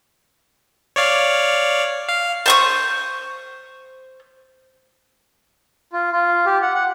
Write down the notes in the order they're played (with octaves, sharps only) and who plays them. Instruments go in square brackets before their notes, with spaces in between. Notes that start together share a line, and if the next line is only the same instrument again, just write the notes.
[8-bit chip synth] C#5 D5 F5
F5
[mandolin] C5 C#6 D#6
[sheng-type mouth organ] F4
F4
G4
F#5
F#5